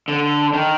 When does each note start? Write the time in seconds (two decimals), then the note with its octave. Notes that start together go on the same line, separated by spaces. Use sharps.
0.08 D3
0.53 D#3